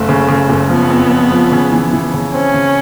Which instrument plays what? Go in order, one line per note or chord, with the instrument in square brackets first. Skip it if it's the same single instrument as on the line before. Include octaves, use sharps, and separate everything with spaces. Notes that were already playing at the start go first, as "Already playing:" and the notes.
Already playing: [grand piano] F#1 [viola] A3
[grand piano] C#3
C#3
F#1
[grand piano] F3 [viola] B3
[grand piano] F2
F2
F3
C#3
E3
E3
C#3
[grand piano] C4 [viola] C#4
[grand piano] C#3